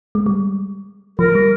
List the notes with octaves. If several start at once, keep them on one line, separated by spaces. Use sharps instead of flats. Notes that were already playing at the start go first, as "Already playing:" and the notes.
G#3
G3
F3 A#4
G3